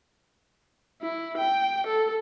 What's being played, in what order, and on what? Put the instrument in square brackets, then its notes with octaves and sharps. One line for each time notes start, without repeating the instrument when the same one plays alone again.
[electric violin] E4
G5
A4